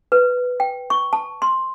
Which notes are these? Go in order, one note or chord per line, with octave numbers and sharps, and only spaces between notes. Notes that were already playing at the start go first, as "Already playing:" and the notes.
B4
G5
C#6
A5
C6